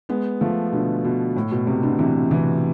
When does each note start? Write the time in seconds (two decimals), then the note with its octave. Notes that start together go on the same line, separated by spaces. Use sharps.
0.09 G#3 B3
0.41 F3 A3
0.72 B2 D3
1.04 B2
1.36 A2
1.51 B2
1.67 A2 C3
1.83 B2 D3
1.99 C3 E3
2.31 C3 E3